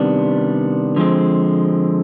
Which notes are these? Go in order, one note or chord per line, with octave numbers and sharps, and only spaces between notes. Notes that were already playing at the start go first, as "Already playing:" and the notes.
Already playing: C3 D#3 G3 B3 D4
D3 F3 G#3 C4